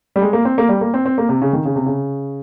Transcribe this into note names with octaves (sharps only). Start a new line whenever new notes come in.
G3
G#3
A#3
C4
A#3
G3
A#3
C4
C4
A#3
C3
C#3
D#3
C#3
C3
C#3